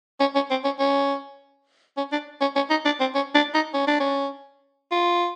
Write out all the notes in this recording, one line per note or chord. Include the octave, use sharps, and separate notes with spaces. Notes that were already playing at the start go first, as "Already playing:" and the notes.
C#4
C#4
C4
C#4
C#4
C#4
D4
C#4
C#4
D#4
D4
C4
C#4
D4
D#4
C#4
D4
C#4
F4